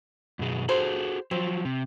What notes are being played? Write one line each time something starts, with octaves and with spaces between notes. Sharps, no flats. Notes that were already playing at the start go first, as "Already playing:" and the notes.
F#2 B2 G#4
F#4 G#4 A4 C5
F3 F#3 C4
C3